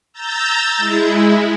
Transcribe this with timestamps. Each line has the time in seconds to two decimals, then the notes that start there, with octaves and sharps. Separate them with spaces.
0.13 A#5 E6 G6 A6
0.77 G#3 E4